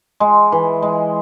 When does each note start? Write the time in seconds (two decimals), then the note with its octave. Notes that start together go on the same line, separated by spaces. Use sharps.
0.20 G#3
0.52 E3
0.83 G#3